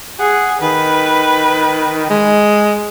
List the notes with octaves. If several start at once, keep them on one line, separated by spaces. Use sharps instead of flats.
G#4 F#5
D#3 B4
G#3